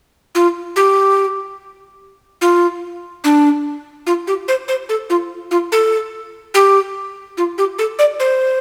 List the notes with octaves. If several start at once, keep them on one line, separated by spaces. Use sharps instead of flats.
F4
G4
F4
D4
F4
G4
C5
C5
A4
F4
F4
A4
G4
F4
G4
A4
D5
C5